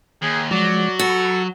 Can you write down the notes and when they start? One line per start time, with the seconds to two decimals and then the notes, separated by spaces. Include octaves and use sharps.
0.22 D#2 G#4
0.51 F3 F#3 G#3 D5
0.99 F#4 A4 B5